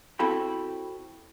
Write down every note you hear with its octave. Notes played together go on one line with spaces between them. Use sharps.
C4 E4 F#4 A4 G5 B5